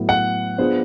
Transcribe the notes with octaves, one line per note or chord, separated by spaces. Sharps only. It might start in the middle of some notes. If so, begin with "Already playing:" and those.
Already playing: A2 F#3 B3 E4
F#5
B3 D4 F4 G#4 C5